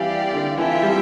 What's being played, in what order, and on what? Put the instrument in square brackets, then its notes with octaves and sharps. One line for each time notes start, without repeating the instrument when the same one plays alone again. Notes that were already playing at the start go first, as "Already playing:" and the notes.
Already playing: [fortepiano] E3 G3 [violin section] G4 D5 F5
[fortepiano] D3
[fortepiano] E3 [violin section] F4 A4 E5 G5
[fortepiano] G3